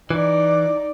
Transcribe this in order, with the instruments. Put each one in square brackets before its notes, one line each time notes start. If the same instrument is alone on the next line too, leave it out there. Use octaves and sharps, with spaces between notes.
[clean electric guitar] E3 [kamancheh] D#4 D5